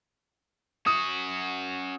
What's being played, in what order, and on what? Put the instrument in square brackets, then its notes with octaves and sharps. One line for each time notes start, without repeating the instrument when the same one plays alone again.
[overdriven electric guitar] C#4 F#4 [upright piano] D#6